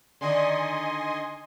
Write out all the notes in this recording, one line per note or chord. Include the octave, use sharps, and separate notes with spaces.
D3 D#3 D#5 G#5 C6